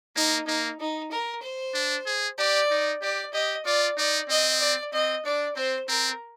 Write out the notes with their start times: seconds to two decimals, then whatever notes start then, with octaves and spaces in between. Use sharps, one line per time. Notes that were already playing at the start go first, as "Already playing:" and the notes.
0.16 A#3 D#4
0.47 A#3 D#4
0.80 D#4
1.11 A#4
1.42 C5
1.74 D4
2.06 G#4
2.38 G4 D5
2.71 D#4
3.02 G4 D5
3.33 G4 D#5
3.65 F4 D5
3.97 D#4 D5
4.29 C4 D#5
4.61 D5
4.93 C4 D#5
5.25 D4 D5
5.56 C4 C5
5.88 C4 A#4